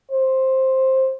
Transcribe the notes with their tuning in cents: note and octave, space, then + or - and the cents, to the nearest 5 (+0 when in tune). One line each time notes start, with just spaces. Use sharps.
C5 +10